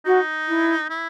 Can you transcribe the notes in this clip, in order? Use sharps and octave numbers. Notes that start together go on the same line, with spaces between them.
D#4 F#4
E4
E4